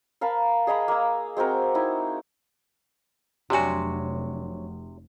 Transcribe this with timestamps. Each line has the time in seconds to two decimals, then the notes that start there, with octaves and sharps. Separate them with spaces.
0.21 A#4 F5 A5 B5
0.67 G#4 D#5 A#5 B5
0.88 A#3 E6
1.37 G#3 C4 F#4 A#4
1.75 D#4 E4
3.50 F1 C3 F#3 D4 F#4 G4 C#5 G#5